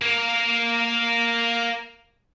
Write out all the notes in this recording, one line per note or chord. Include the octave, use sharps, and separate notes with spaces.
A#3 A#4